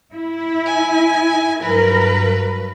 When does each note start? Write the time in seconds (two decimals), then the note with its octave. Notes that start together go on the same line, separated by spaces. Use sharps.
0.13 E4
0.66 G#5
1.63 G2 F#3 A#4 B4